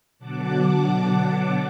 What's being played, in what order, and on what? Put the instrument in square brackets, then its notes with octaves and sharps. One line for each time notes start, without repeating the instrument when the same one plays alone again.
[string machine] B2 D3 F#3 F#5 A5 D6